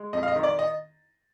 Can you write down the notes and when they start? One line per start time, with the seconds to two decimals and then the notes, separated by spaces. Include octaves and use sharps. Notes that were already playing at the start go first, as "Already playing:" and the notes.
Already playing: G#3
0.13 F2 D#5
0.23 F5
0.28 D#5
0.36 D#3
0.43 D5
0.59 D#5